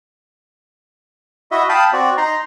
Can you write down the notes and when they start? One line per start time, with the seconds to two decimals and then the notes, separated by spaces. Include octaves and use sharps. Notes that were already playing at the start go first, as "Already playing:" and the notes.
1.51 E4 F#4 D#5 E5
1.69 F5 G5 A5 B5 D#6
1.93 C4 F#4 D5
2.18 D#4 A#5 C6